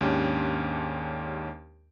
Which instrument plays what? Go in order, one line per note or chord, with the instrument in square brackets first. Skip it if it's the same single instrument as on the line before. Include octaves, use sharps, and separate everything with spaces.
[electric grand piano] D#2 G#2 C#4 D4 G4